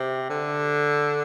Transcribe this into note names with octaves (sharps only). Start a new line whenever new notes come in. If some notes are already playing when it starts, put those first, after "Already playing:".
Already playing: C3
D3